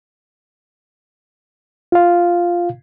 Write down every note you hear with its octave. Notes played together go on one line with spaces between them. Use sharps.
F4 F5